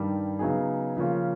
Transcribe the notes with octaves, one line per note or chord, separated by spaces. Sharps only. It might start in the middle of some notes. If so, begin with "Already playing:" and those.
Already playing: G2 D#3 G3
C#3 F#3 B3 D#4 G#4
C#3 F3 A#3 C#4 F4